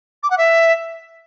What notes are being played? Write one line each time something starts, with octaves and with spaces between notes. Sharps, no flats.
D6
F#5
E5